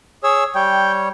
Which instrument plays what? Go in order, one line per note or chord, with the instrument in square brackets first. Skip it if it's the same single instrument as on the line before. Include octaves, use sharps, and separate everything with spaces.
[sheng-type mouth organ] G#4 C#5 E6
[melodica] G3 C#5 [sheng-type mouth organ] G5